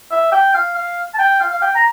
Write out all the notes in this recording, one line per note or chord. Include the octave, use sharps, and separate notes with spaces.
E5
G5
F5
F5
A5
G5
F5
F5
G5
A#5